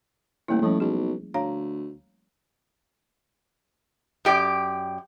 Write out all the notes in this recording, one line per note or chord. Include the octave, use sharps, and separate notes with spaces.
D#1 A3 A#3 E4
A2 F3 G3 C#4
B1 G#4
D2 C#5 F5 A#5
F#2 G4 D5 G5